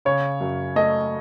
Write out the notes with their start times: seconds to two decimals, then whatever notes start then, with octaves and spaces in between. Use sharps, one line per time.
0.05 C#3 C#5
0.40 F#2
0.76 A3 D#5